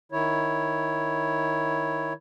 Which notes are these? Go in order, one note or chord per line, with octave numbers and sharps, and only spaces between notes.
D#3 E4 C#5